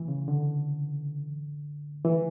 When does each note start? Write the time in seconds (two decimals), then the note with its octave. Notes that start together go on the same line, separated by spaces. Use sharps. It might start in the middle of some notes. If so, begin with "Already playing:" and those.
Already playing: E3
0.08 C#3
0.28 D3
2.05 E3